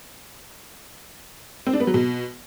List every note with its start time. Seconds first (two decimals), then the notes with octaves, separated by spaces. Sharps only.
1.67 C4
1.73 D4
1.80 B3
1.87 F#3
1.94 B2